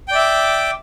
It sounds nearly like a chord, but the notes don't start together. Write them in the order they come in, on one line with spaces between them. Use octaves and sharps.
G5 D5 E5 D6